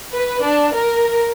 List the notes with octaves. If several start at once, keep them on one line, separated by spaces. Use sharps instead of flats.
B4
D4
A#4